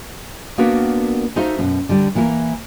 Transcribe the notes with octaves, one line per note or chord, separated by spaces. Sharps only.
A#3 B3 D4 F#4 A#4 B4
D#4 F#4 A4 C5 E5 F5
F#2 B2
D3 G3
E3 A#3 E4 A4 A#4